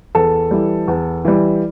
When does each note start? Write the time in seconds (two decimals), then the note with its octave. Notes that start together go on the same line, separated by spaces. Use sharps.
0.15 E2 A4
0.51 E3 G3
0.88 E2
1.25 E3 G3